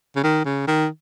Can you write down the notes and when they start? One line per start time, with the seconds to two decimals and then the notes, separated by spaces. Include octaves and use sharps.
0.16 C#3
0.24 D#3
0.45 C#3
0.67 D#3